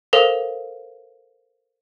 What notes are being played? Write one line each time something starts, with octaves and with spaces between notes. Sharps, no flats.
A4 A#4 C5 F5